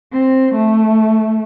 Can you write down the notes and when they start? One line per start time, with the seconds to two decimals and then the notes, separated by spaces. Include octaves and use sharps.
0.12 C4
0.55 A3